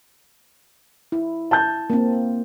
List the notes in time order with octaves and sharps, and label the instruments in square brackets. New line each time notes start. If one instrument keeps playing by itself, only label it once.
[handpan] E4
[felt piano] A5 G6
[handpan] A#3 C4